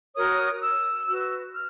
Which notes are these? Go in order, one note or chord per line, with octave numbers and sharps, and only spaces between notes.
F#4 A#4 C#5 D#6
E6
F#4 B4
F6